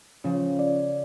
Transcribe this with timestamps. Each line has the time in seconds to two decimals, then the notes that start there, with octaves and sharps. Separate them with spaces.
0.24 C#3 F3 C#4
0.59 D5